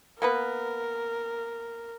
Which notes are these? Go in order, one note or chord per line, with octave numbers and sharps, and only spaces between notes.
A#3 B3 A#4 B4